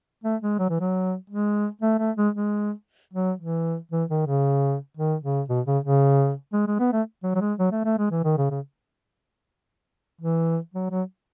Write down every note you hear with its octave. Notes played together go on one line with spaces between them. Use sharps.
A3
G#3
F#3
E3
F#3
G#3
A3
A3
G#3
G#3
F#3
E3
E3
D#3
C#3
D#3
C#3
B2
C#3
C#3
G#3
G#3
B3
A3
F#3
F#3
G#3
F#3
A3
A3
G#3
E3
D#3
C#3
C#3
E3
F#3
F#3